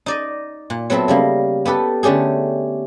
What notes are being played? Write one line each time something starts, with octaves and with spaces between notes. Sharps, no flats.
D#4 D5 D#5
A#2
F#3 B3 C4 A4 E5
C#3 G3 A#3
B3 G4 A4 B4
D3 A3 C#4 G4 G#4